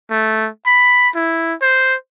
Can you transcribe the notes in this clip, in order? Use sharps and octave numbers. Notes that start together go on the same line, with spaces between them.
A3
B5
E4
C5